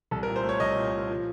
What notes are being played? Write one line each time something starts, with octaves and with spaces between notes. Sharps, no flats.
C2 A4
A#4
A#2
C5
A3
C#5
C2 D#5
A#2
A#2
F3